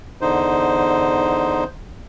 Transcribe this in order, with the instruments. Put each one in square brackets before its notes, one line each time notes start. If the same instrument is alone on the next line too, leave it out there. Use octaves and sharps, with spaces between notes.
[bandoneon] E2 D3 D#4 C5